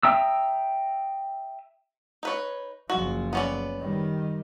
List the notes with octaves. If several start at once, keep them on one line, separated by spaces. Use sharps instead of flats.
E5 G5 A#5 D#6 E6
D#4 B4 C#5
F#1 F3 F#4
B3 C#4 D5
D#3 G3